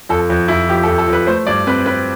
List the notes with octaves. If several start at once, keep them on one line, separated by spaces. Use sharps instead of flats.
F2 A4
F2
F2 E4
F3 G4
A4
F2
A4
F2
B4
A3 C5
G2 D5
C4 B4
C4 B4